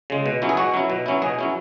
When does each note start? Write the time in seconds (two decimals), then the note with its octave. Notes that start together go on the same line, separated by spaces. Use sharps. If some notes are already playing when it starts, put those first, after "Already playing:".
0.10 C#3 G#3
0.26 B2
0.42 F#3 C#4 E4
0.49 G#4
0.57 B2 F#4
0.74 F#3 C#4 E4
0.90 B2
1.06 F#3 C#4 E4
1.22 B2 G#4
1.39 F#3 C#4 E4